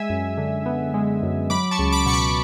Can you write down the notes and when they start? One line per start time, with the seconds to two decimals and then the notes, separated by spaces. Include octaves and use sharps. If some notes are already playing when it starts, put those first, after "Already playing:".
Already playing: G#3 E5 G#5
0.10 F#2
0.37 D3
0.66 B3
0.94 G#3
1.23 F#2
1.50 F#3 B5 D6
1.71 A5 C#6
1.79 C#2
1.93 B5 D6
2.06 B2 C#6
2.13 B5 D6